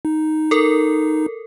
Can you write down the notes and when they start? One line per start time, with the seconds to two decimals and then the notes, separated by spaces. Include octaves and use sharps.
0.05 D#4
0.51 A4 A#4